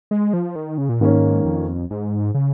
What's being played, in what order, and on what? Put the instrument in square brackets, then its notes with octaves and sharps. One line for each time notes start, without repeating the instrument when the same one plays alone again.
[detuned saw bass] G#3
F3
D#3
C#3
A#2
[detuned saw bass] G#2 [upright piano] D#3 A#3 C#4
[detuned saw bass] F2
G#2
C#3